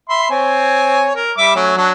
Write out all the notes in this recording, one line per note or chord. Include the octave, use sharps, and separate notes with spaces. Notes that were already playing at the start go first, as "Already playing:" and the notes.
E5 B5 C6
C4 C#5 G#5
A#4
G3 E5 D6
F#3 A3 C#4
F#3 D4